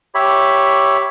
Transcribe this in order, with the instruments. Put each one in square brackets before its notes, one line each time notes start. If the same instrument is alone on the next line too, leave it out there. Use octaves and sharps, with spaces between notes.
[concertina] G4 C#5 E5 B5